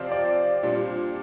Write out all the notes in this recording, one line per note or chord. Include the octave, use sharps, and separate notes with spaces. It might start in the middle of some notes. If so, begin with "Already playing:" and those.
Already playing: C3 F3 C4 F4 C5 D5
D5
A#2 G3 D4